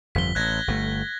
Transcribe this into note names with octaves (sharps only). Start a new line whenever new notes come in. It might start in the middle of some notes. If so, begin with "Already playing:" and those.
G1 F2 F3 B6 G7
A1 F#6 G#6 A#6
G1 A#2 A3